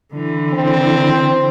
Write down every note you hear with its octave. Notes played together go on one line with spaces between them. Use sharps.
D3 E3
C4